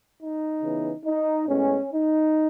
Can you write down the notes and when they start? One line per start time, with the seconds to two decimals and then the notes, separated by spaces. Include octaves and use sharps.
0.20 D#4
0.63 C#3 E3 B3
1.06 D#4
1.48 A2 G#3 B3 C#4
1.91 D#4